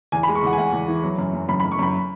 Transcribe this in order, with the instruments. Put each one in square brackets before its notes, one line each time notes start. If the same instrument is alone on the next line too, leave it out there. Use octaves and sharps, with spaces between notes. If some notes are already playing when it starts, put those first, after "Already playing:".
[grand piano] E2 G#5
B5
G#3
C#6
E2 F#5
G#5
E2 F#5
E2
E3
F#3
F#2
F#2
F#2 B5
B5
F#2
C#6
F#2 B5